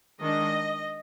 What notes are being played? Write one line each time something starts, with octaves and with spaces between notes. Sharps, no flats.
D#3 G#3 D4 D#5